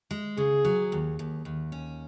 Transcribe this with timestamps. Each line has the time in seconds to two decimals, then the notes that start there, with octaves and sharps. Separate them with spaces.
0.11 G#3
0.37 C#3 G#4
0.65 F#3
0.92 D#2
1.19 D#2
1.45 D#2
1.72 C#4